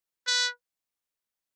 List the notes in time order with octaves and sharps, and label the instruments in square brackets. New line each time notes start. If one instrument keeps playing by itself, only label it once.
[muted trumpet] B4